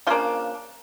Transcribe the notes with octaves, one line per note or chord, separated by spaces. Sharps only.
C#3 F3 A#3 D4 F4